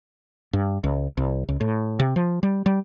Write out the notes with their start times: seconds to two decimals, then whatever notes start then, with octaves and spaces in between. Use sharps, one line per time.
0.53 G2
0.84 C#2
1.17 C2
1.49 C#2
1.61 A2
1.99 C3
2.16 F3
2.43 G3
2.66 G3